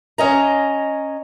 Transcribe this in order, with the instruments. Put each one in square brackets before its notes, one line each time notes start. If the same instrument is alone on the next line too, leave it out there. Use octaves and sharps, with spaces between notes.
[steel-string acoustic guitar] C#4 D#5 A#5